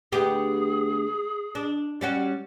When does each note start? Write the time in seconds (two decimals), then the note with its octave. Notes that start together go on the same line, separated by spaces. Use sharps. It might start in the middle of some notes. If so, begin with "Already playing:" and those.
0.12 D2 B3 G4 G#4
1.55 D4
2.01 G3 C#4 F#4